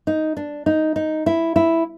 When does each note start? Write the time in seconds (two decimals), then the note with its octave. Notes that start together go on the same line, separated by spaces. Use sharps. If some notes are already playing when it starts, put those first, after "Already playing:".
0.07 D#4
0.37 D4
0.66 D#4
0.96 D#4
1.26 E4
1.56 E4